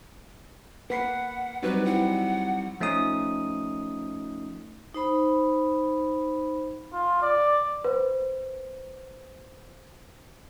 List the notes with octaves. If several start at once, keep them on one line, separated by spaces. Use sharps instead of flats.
A#3 B4 F#5 B6 C7
F#3 G3 C4 D#4 B4
E4 F#5
F3 A3 C#4 D#4 D#6
D#4 C5 B5
F4
D5
B4 C5